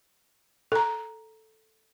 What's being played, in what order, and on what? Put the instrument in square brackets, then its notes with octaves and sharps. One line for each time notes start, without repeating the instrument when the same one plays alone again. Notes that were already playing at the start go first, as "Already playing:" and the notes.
[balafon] A4 A#5